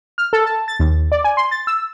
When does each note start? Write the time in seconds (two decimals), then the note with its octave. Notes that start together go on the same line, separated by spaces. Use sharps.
0.18 F6
0.33 A4
0.46 A5
0.68 A6
0.79 D#2
1.12 D5
1.24 G#5
1.37 C6
1.51 A6
1.67 E6